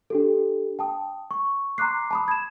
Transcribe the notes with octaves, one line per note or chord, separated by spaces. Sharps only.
D4 G4 A4
G5 A5 D#6
C#6
A#5 C6 D6 F#6 C7
A5 B5 D#6
G#6 E7